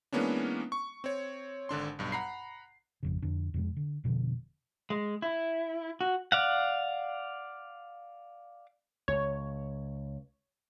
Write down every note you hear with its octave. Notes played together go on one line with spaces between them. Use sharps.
E3 G#3 A#3 B3 C#4 D4
C#6
C4 C#5
G#1 D3 D4 C6
B1 G2
F#5 A#5 B5 C7
G#1 F2 C#3
F2 D3 D4
F2 C3 G#3
D3
F1 B2 D3 F3
G#3
E4
F#4
D5 F5 F#5
C#2 C#5